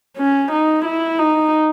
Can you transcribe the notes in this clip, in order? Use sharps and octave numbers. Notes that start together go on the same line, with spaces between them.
C#4
D#4
E4
D#4